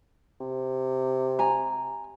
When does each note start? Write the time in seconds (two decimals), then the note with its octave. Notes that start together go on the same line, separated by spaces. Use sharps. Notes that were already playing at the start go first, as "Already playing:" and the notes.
0.40 C3
1.39 G#5 A#5